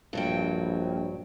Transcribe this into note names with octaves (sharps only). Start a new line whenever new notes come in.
A#1 G2 F#3 G5